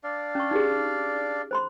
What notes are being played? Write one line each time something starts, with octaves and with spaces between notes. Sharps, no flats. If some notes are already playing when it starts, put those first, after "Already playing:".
D4 D5 F5
C#4 C#6
D#4 G4 G#4
C5 B5 C6